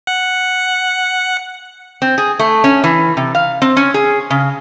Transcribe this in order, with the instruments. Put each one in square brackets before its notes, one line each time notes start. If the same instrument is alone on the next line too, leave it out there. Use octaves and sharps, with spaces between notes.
[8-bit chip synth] F#5
[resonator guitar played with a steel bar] C4
G#4
A3
C#4
E3
C3
F5
C4
C#4
G#4
C#3